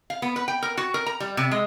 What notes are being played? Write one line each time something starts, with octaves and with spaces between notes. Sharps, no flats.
F5
B3
B4
G5
A#4
F#4
A#4
A#5
G3
C3
G#3